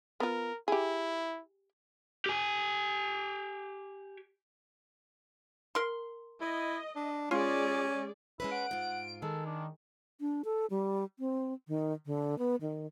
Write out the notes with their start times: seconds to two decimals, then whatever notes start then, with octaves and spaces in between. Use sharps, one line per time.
0.20 B3 F4 A#4
0.68 E4 G4 G#4
2.26 G4 G#5
5.75 A#4 C6
6.41 E4 D#5
6.96 D4
7.31 G#3 C#4 F4 G#4 D5
8.40 G#3 C#4 E4 B4
8.51 F#5 D7
8.71 G#2 F4
9.22 D#3 G#3 A4
9.46 D4
10.21 D4
10.45 A4
10.70 G3
11.19 C4
11.68 D#3
12.06 D3
12.38 B3
12.61 D#3